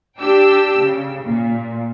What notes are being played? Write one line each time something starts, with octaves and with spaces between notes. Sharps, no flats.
D4 G4 G5 E6
C#3
A#2